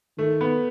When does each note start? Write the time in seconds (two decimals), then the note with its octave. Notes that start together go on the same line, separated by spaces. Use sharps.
0.18 D#3 A3
0.41 B3